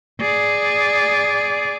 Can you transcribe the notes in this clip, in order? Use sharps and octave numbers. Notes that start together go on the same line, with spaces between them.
G#4 D5